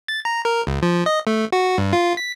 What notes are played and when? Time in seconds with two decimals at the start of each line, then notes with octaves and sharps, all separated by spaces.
0.08 A6
0.25 A#5
0.45 A#4
0.67 C#2
0.82 F3
1.06 D#5
1.27 A3
1.52 F#4
1.78 G2
1.93 F4
2.17 B6